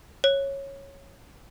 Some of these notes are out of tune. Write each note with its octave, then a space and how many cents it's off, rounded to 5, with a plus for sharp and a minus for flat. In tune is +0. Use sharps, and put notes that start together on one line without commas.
C#5 -10